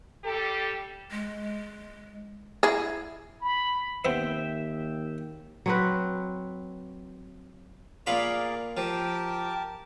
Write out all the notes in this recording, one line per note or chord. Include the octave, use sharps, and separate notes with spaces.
G3 G4 A4
G#3
E4 G#4
B5
D#2 B3 C4 E5 G5
F#3 C4 B4
A#2 F4 G#4 A#4 D5 B5
F3 G4 A#4 G5 A5